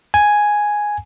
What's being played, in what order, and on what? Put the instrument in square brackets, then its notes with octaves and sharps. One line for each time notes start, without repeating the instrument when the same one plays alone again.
[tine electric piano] G#5